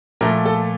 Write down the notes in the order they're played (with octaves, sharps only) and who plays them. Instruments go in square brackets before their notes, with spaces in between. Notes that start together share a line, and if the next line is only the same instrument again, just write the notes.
[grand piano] A#2 F3 A3 A#4
A4